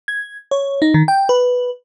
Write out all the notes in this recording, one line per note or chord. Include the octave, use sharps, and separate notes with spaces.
G#6
C#5
D#4
D#3
G5
B4